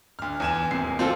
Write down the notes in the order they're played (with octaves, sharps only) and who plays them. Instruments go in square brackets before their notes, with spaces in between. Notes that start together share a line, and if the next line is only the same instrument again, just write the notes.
[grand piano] D2 F6
E2 G#5 E7
D#1 C3 C7
[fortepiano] C4 F4 A4 [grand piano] C6